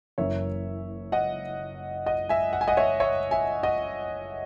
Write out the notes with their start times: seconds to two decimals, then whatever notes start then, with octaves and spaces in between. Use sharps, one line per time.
0.18 F#1 F#2 E3 A#3 C#4 C#5 E5
1.12 D#5 F#5
2.06 D#5 F#5
2.29 E5 G#5
2.53 F#5
2.61 G#5
2.68 D#5 F#5
2.77 C#5 E5
3.00 C#5 E5
3.31 E5 G#5
3.63 D#5 F#5